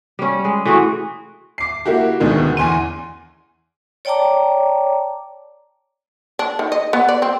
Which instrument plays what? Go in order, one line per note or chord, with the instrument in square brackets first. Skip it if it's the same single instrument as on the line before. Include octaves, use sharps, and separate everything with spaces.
[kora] G3 C#4
G#3
E3 A3 F#4 G#4
[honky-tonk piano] D6 C7
A#3 E4 F#4 G4
D2 B2 D3 D#3 G#3 B3
E2 G#5 C6 D#7
[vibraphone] C#5 D5 G5 A5 A#5 D6
[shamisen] D4
D#3
D#5
B3
D5
C4